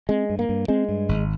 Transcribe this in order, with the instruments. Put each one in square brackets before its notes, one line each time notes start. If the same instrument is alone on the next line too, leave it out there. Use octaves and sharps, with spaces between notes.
[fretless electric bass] G#3 [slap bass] C4
[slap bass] G2
[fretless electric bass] A#3
[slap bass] G2
[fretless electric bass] G#3 [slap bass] C4
[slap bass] G2
G#1